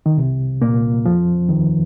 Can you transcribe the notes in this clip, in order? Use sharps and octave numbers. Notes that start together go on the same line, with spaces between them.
D#3
C2 C3
A#2 A#3
F2 F3
D#2 D#3